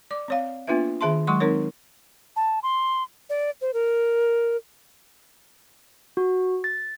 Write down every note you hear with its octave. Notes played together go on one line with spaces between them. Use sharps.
D5 D6
C4 C#5 F5
A#3 B3 D4 F4 B4 E5
D#3 G#4 E5 A5 C6
F#3 G#3 C6 C#6
C4 D#4 A#4 C#5
A5
C6
D5
C5
A#4
F#4
A6